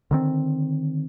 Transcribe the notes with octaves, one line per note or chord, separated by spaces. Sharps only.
D3 D#3 C4